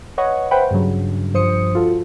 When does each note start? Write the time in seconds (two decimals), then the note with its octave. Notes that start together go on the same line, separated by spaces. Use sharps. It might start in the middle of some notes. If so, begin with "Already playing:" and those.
0.18 B4 C#5 D#5 F#5 C#6
0.51 B4 C5 E5 F#5 G5 B5
0.71 G2 C#3 F#3
1.34 G2 F3 C5 D#6 C#7
1.75 F4 F#4 A4